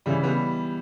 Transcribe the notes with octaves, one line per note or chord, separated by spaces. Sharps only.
C#3 E3 G3
G3 B3